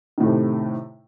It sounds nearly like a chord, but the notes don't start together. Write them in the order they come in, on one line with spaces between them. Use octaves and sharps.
D#3 A2 A3 C3